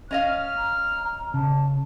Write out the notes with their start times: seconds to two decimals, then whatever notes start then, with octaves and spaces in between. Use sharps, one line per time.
0.11 C#4 D#5 F5 F6
0.58 A#5
1.34 C#3 A5